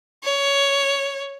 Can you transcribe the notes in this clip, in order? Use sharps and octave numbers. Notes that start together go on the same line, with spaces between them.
C#5